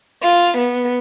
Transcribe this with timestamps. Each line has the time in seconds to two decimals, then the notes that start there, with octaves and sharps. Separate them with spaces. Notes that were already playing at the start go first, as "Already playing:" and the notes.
0.22 F4
0.58 B3